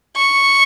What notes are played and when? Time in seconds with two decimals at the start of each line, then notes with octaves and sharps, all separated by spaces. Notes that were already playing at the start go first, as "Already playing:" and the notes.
0.16 C#6